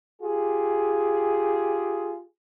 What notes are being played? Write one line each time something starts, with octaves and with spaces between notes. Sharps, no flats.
F4 G4 G#4